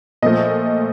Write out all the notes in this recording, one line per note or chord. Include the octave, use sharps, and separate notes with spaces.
A#2 F3 A3 D#5